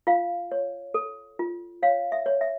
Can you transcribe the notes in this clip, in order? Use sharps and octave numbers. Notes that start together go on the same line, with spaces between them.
F4 F5
C#5
A4
F4
C#5 F5
E5
C#5
E5